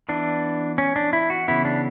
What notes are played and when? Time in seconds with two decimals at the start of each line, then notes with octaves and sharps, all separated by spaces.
0.09 E3 B3 D4
0.78 C#4
0.96 D4
1.13 E4
1.30 F#4
1.48 C#3 E3 B3 E4
1.65 D4